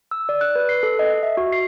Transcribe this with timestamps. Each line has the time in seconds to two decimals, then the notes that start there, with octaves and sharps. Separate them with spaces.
0.11 E6
0.29 D5
0.41 F#6
0.55 B4
0.69 C7
0.83 A4
0.99 D#5
1.23 E5
1.37 F#4
1.52 C7